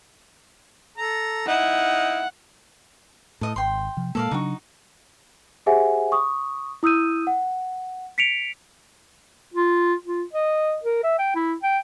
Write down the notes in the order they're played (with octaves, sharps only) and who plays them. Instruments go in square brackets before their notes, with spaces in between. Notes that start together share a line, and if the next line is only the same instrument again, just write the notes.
[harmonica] A4 A#5
[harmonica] D#4 E4 [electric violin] F#5
[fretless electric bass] A2 [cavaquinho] A4 D#5
[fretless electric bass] G#1 [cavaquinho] G5 C6
[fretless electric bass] C3 F3
[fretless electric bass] A#2 G#3 A#3 [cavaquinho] A4 D5 F5
[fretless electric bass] C#3 F#3 D4 [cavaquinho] D#4 F#4
[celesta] G4 G#4 C5 E5 F#5 G#5
C#6 D#6
E4 D#6 E6 G6 D#7
F#5
B6 C#7 D7 F7
[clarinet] F4
F4
D#5
A#4
E5
G5
E4
G5